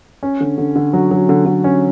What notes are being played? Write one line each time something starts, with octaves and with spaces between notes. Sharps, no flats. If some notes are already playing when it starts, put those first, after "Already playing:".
C#4
D3
D3
D3
F#3
F#3
D3
D3
C#4